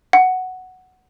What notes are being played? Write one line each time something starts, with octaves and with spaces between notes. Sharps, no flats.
F#5